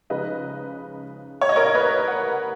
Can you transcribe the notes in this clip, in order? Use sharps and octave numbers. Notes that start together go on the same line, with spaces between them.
C#3 F3 G#3 D#4 B4 D#5
C#5
D#5
A#4 C#5
B4 D#5
D#5 F#5